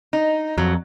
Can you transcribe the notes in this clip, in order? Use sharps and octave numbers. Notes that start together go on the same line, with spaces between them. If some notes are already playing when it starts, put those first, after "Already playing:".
D#4
F2 F#3